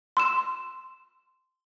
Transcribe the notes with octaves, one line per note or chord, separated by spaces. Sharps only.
C6 E6 E7